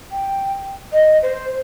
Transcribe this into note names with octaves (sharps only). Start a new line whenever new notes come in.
G5
D#5
C5